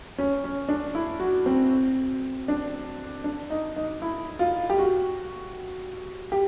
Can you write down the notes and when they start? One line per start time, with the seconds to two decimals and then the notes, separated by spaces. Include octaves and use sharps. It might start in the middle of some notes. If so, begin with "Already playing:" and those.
0.18 C#4
0.44 C#4
0.69 D4
0.95 E4
1.20 F#4
1.46 C4
2.48 D4
3.24 D4
3.50 D#4
3.76 D#4
4.02 E4
4.39 F4
4.70 G4
4.78 F#4
6.32 G4